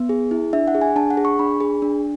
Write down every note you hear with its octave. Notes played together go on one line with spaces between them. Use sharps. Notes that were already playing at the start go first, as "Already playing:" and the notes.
Already playing: B3
G#4
E4
D4 E5
F#5
G#4
G#5
D4 A5
F#5
G#4
C#6
D4 B5
G#4
D4